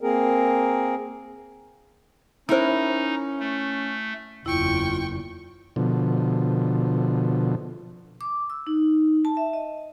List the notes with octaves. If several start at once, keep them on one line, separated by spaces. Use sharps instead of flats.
A#3 C4 G#4 A#4
C#4 D#4 E4 A#4 C5 E6
A3
F#1 E2 E4 F4 G5 C#6
B2 D3 F3
D6
E6
D#4
A5
E5
D#5